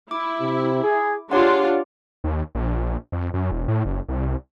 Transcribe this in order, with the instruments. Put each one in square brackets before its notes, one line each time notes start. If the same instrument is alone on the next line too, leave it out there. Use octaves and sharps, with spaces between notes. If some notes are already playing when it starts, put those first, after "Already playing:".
[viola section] E4 [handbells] D6
[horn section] C3
G#4
[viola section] D4 F4 [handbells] G4 C#5 F#5 [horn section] G#4 C6
[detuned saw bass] D#2
A#1
F2
F#2
E1
A2
F#1
C2